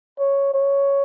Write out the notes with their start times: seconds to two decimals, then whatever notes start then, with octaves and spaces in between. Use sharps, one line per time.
0.19 C#5
0.54 C#5